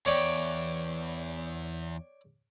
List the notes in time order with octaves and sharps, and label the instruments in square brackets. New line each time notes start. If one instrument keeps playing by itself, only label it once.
[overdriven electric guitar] E2 [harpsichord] C#5 D5 G5